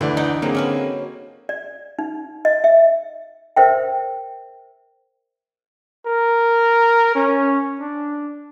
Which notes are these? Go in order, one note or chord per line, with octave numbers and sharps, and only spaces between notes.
D2 D3 E3 D5
D#4
F#3 A#3 C4 G#4
F#3 C#4 B4
D5
D#4
D#5
E5
A#4 C5 E5 G5
A#4
C#4
D4